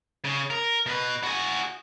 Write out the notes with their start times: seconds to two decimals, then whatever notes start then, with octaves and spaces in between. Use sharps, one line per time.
0.25 C#3
0.50 A#4
0.86 B2 B4
1.23 F#4 G#4